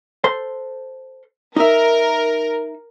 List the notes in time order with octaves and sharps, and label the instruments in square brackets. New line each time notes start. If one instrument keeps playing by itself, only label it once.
[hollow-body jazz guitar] A4 C5 C6
[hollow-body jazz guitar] D#4 E5 [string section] A#4